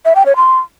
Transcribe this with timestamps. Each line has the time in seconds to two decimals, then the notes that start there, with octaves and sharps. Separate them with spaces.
0.05 E5
0.16 G5
0.26 C#5
0.36 C6